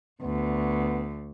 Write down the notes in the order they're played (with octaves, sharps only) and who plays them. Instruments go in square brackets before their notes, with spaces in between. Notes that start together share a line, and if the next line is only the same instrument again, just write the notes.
[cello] D2 [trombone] B3